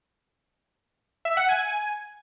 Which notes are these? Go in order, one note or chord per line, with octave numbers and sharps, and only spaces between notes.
E5
F#5
G#5